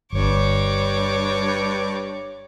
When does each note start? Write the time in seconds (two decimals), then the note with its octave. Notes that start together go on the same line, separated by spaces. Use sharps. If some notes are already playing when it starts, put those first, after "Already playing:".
0.13 G1 G2 C#5 D6